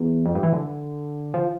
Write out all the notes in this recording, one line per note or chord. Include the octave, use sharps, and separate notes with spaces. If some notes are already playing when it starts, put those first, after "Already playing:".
Already playing: E2
F2
G2
E3
D3
F3